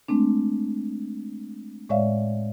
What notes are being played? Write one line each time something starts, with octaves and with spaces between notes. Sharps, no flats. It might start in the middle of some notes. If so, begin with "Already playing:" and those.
G#3 A3 C4 D4
A2 G#3 C#5 D5 E5 F5